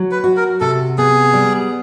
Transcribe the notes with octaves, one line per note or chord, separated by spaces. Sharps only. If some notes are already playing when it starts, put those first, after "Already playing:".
Already playing: F#3
B4
F#4
A#4
C3 A4
B3 G#4
G3